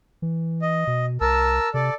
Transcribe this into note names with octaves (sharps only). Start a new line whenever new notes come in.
E3
D#5
B2
C2 A#4 A5 E6
C3 A4 D5